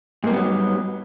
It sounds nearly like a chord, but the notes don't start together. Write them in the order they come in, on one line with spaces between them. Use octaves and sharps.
G#2 A#3 G3 B3 F#3